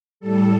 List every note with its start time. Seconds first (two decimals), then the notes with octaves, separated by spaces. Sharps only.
0.20 A2 G3 A4